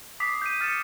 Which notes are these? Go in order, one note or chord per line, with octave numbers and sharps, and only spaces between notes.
D6 D#6 B6 C7
G6 D#7
F6 A6 C#7 D#7 E7